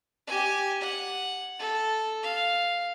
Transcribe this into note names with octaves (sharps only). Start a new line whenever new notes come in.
G4 G#5
F#5
A4
F5